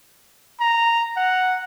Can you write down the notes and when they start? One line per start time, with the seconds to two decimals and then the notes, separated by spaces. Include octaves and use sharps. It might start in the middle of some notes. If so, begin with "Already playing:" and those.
0.60 A#5
1.17 F#5